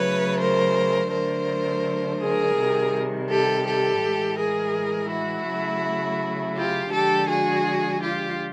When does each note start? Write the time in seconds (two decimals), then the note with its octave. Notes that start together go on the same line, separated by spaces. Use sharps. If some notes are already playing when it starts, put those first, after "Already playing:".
Already playing: C#3 F#3 A3 B4 C#5
0.38 A#4 C5
1.11 D3 F#3 A3 A#4 C5
2.20 G#4 A#4
2.57 C3 D#3 G3
3.29 G4 A4
3.65 G4 A4
4.02 A2 E3 G#3
4.38 G#4 A#4
5.10 E4 F#4
5.47 C#3 F#3 A3
6.56 F4 G4
6.92 D3 F3 G#3 G4 A4
7.28 F#4 G#4
8.02 F4 G4